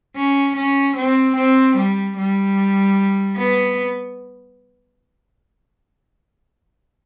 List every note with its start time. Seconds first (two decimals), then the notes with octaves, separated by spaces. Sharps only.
0.17 C#4
0.56 C#4
0.97 C4
1.37 C4
1.77 G3
2.17 G3
3.37 B3